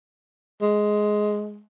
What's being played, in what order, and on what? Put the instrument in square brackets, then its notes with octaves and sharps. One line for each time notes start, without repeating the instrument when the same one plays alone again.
[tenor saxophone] G#3